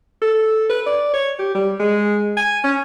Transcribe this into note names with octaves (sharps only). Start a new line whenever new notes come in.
A4
B4
D5
C#5
G4
G3
G#3
G#5
C#4